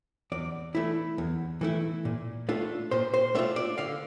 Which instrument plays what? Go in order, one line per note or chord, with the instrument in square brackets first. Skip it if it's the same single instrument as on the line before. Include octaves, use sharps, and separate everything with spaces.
[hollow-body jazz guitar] E2 D5
E3 A3 E4
E2
E3 A3 E4
A#2
A3 D4 F4
A#2 C5
C5
A3 D4 F4 E5
D5
D3 F5